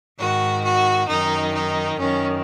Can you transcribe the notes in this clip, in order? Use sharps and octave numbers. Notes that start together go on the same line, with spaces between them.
G#2 D#3 F#4
F#4
F#2 D#3 D#4
D#4
F#2 D#3 C#4